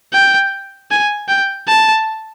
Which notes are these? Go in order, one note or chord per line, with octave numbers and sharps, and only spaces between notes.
G5
G#5
G5
A5